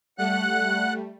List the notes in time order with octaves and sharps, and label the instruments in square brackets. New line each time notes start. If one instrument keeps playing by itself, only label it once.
[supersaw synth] G3 A3 [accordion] F#5 F#6